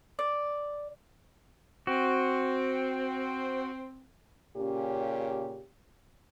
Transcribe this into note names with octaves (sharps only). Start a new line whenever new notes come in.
D5
C4 F#4
A#2 C#3 C#4 G4